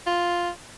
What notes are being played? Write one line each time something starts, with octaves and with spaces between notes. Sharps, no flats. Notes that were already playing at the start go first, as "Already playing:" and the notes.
F4